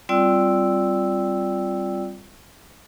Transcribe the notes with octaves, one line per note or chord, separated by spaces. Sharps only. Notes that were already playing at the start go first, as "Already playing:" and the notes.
G3 C4 F4 D5 G5 E6